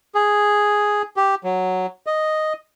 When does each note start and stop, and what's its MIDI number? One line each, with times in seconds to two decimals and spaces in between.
0.15 1.02 68
1.17 1.35 67
1.44 1.86 54
2.07 2.53 75